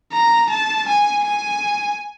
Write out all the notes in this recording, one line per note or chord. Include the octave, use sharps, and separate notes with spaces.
A#5
A5
G#5
G#5